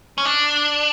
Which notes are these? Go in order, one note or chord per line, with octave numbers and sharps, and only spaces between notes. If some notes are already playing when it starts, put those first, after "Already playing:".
C#4
D4